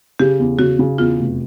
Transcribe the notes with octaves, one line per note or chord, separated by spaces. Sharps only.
C#3 G4
E2
C#3 F#4
C#3
E2 F4
F1